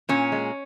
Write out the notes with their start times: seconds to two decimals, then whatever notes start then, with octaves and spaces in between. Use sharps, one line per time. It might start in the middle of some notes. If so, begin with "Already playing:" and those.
0.09 A#2 C#4
0.32 G#3